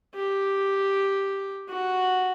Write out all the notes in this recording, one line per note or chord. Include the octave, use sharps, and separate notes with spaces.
G4
F#4